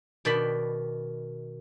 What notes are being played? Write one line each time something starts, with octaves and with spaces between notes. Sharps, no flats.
B2 D#3 D5 G5 A5 B5